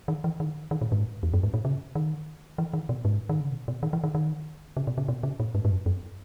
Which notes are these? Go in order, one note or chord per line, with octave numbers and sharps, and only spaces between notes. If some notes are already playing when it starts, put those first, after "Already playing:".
D#3
E3
D#3
D#3
A#2
G#2
E2
F#2
G#2
A#2
C#3
D#3
E3
D#3
B2
G#2
D#3
C#3
B2
B2
D#3
E3
D#3
D#3
C#3
B2
C#3
B2
C#3
A#2
G#2
G#2
F#2
F#2